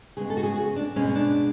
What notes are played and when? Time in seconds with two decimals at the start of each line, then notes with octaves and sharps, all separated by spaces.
0.17 C#3 G#3 B3 G#4
0.30 A4
0.37 F#4
0.43 G#4
0.56 F#4
0.76 D4
0.96 B2 G#3 B3 C#4
1.07 C#4
1.15 D4